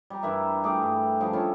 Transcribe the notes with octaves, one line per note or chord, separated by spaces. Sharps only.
G3 A#5
G2 E3 A#4 E5
G3 A3 G#4 D6
G2
F3 G3 D4 G#4
C#4 E4 A4